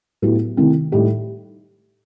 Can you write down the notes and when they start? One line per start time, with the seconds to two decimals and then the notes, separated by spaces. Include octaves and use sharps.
0.22 A2 F#3 B3 E4 G4
0.57 C3 D#3 A3 C4 E4
0.92 A2 G3 D#4 G4